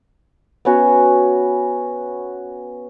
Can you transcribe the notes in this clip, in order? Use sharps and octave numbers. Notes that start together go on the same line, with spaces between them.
B3 C#4 F#4